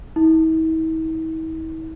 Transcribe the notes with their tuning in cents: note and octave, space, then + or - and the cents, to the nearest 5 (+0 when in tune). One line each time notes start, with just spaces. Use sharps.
E4 -45